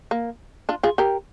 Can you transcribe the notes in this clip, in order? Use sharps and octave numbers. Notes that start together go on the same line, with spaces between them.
A#3
D4 F4
F4 G#4
G4 A#4